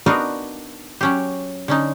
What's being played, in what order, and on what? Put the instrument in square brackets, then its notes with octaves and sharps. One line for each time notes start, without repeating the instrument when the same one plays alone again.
[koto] B3 D4 D#4 F#4 A#4 F5
F#3 C#4 G4
D3 C#4 D#4